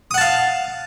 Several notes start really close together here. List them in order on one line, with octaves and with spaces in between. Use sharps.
D#6 F#5 A5 F5